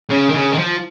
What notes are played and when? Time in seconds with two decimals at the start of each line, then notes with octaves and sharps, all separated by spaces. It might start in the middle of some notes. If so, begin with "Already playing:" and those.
0.10 C#3
0.29 D#3
0.34 C#3
0.51 D#3
0.58 F3